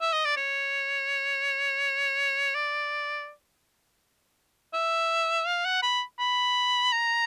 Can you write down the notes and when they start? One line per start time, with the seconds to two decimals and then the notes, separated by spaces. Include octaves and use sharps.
0.01 E5
0.13 D#5
0.25 D5
0.37 C#5
2.55 D5
4.74 E5
5.47 F5
5.65 F#5
5.83 B5
6.19 B5
6.92 A#5